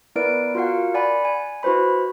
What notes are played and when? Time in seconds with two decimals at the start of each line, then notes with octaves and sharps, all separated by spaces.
0.16 B3 E4 A#4 B4 D5 D7
0.55 F4 F#4 A#4 F5 F#5
0.94 D5 F#5 G#5 B5
1.25 G#5
1.63 E4 F#4 B4 C5 B5